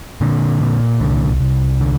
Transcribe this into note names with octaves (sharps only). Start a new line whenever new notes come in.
A#2 D3
A#2
C2 D3
C2
D3